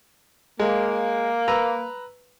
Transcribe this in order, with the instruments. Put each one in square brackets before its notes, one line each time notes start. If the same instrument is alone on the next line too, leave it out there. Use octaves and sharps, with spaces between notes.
[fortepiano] G#3 [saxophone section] A#3
[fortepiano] B4 A#5 E6